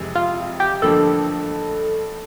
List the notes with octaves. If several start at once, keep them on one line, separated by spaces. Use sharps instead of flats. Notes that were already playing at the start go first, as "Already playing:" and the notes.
Already playing: F2 C3 E3 G#3
F4
G4
A1 G2 D3 F3 A#3 A4